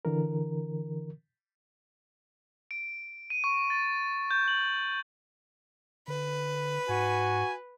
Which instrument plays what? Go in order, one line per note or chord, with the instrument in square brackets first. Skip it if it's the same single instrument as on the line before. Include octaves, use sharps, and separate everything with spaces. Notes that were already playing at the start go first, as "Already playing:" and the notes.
[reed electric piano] D3 E3 A#4
[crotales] D7
D#7
C#6
A6
G6
F#7
[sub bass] D3 [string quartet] B4
[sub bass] G#2 [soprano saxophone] F#4 [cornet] G#5